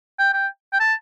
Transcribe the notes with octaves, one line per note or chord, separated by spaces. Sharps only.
G5
G5
G5
A5